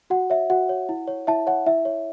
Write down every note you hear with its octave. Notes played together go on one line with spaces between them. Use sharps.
F#4 F#5
C#5 E5
F#4 F#5
C#5
E4
C#5
E4 E5 A5
C#5 F#5
E4 E5
C#5